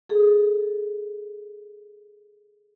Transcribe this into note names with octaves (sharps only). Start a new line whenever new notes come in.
G#4 A4